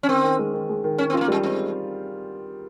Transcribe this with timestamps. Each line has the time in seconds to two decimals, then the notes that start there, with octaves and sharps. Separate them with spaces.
0.03 C#4
0.09 D#3 C4
0.24 D#3
0.39 G#3
0.54 D#3
0.69 G#3
0.84 D#3
0.98 D#3 C#4
1.10 C4
1.14 G#3 F4
1.21 A#3
1.28 G3 G#3
1.43 G#3 C4